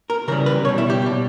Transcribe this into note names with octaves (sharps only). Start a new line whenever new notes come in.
A#4
C#3 E3 G3 A#4
B4
B2 G3 C#5
E4
G4
B2 G3